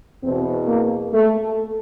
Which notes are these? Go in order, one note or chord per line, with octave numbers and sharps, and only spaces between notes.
E2 B2 C4
A#3
A3